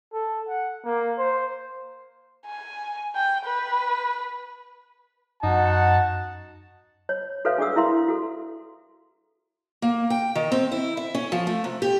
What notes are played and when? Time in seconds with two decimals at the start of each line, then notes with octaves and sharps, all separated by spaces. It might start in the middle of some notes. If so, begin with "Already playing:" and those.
0.13 A4
0.48 F#5
0.85 A#3
1.18 C5
2.47 G#5
3.15 G5
3.45 B4
5.43 F#2 D#4 F#4 F#5 A5
7.09 C#5
7.45 F#4 A4 B4 C#5 E5 F5
7.58 D4 G#4 D5 F#5 D#6 E6
7.76 E4 A#4 E5 F5 A#5 C6
8.08 F#4 A4
9.82 A#3
10.10 G5
10.35 D#3
10.52 C4
10.72 E4
10.97 E5
11.15 C#4
11.32 F3
11.47 A3
11.64 C3
11.82 G4